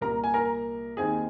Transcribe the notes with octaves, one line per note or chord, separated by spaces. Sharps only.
C2 A#2 A#3 A#4 A#5
G#5
A#4 A#5
D#2 D#3 C4 D#4 G#4 G#5